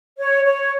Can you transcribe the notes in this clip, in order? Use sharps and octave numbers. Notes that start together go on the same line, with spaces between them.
C#5
C#5